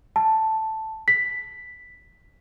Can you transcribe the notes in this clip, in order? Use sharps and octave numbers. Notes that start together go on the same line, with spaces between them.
A5
B6